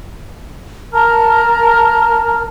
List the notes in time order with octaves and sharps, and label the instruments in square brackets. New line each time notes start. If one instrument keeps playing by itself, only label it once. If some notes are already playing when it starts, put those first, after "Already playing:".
[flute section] A#4 A5 A#5 F6